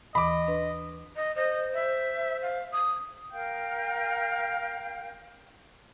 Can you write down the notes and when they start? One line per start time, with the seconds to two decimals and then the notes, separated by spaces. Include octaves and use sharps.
0.15 D#2 E3 D#5 B5 D6
0.48 D4 B4 C6
1.16 D#5
1.36 C5 D#5
1.74 E5
2.42 F5
2.72 D#6
3.32 A#4 F5 G5 G6